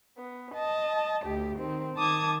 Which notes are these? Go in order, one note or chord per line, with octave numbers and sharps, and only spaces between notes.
B3
D#5 A5
D2 G4
D#3 C4
D#3 A5 D6 D#6 G#6